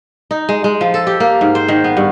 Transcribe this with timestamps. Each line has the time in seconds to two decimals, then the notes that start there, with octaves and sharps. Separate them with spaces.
0.31 D#4
0.49 G#3
0.64 G#3
0.81 F3
0.94 A4
1.07 G4
1.20 A#3
1.41 G#2
1.55 C5
1.68 D#3
1.84 B3
1.97 G2